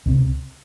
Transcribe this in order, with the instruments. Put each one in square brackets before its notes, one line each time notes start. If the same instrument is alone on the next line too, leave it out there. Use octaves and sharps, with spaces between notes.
[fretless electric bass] C#2 C3